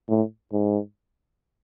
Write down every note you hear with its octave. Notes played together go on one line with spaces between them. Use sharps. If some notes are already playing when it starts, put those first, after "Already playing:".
A2
G#2